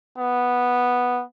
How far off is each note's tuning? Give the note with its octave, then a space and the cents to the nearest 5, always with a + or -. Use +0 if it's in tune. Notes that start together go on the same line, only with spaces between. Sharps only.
B3 -5